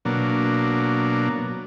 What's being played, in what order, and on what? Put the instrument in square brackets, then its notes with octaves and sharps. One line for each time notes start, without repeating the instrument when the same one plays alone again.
[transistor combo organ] B2 F#3 A#3 D4